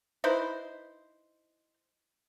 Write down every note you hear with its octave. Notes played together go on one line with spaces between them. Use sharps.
D#4 E4 B4 C5